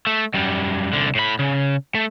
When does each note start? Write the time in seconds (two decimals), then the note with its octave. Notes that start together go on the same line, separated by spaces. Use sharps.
0.07 A3
0.34 F#2 G3
0.93 C2 D3
1.15 A2 B5
1.39 C#3
1.95 A3